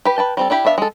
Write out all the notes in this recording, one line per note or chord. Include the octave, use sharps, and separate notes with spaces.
G4 B4
B4 G5 A5
G3 C4 A4
D4 E4 G4 B5
B3 D4 E5 F5
G#3 A4